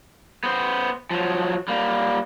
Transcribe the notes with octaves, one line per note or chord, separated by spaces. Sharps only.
B3 C5
F3 F#3
G3 A#3